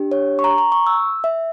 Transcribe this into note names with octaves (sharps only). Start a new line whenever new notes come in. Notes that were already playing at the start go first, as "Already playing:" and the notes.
Already playing: D4 G4
C#5
C#6
A#5
A#5
C#6
E6
E5